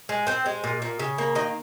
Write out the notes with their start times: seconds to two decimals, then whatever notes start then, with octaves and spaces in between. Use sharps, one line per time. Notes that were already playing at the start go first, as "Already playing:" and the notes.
0.09 G#3
0.27 C4 C5
0.46 G#3
0.64 A#2
0.82 A#2
0.99 C#3
1.18 A#3
1.35 D#3 D#5